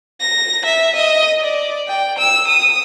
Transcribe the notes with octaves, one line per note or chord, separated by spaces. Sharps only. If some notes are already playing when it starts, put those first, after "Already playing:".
A#6
E5
D#5
D5
G5
E6
D#6